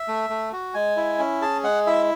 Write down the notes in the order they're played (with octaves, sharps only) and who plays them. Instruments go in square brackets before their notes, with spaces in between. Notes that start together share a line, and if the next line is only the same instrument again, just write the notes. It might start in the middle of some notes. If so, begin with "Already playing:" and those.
Already playing: [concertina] E5
A3
A3
F#4
G#3 G#5
E4
C#4
G#4 A5
G#3 F#5
E4 E5